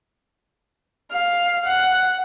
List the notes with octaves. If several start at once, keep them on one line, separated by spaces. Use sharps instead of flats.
F5
F#5